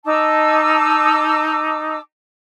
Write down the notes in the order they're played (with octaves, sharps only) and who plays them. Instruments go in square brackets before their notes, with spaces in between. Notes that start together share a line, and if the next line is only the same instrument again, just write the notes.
[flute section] D#4 A5 D6 E6